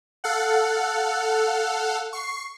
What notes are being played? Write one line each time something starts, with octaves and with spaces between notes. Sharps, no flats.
A4 F5 F#5
C#6 C7